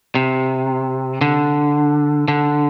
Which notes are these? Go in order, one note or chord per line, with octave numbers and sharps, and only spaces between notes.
C3
D3
D3